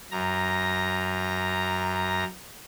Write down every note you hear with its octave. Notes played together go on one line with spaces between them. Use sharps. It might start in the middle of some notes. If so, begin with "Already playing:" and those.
F#2 A#5